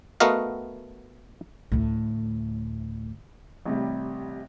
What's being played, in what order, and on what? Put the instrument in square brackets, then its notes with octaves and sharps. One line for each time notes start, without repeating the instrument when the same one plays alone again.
[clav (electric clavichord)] A3 B3 F#4 A#4 D#5 F5
[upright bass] D2 A2
[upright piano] A1 C3 G3